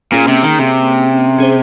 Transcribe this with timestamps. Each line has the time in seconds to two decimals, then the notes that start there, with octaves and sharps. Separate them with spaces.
0.12 A#2 A#3 C#4 G#4
0.28 C3
0.43 D#3
0.59 C3
1.38 C#4 G#4 C5